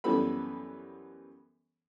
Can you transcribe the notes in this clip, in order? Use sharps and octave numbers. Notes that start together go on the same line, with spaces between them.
F#2 E3 G3 B3 A4 B5